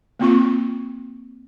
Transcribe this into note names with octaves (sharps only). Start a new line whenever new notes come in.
A#3 C4 F4 C#6